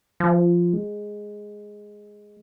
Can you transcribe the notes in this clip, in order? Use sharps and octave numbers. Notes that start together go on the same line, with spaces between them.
F3
G#3